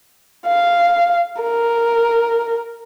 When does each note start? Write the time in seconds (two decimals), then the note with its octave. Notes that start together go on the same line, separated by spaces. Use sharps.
0.46 F5
1.42 A#4